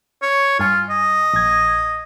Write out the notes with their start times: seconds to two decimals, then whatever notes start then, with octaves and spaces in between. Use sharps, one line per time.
0.22 C#5
0.60 G2 F4 G#5
0.90 D#5
1.34 A#1 G#6